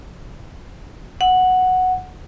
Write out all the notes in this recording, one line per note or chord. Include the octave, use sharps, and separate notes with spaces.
F#5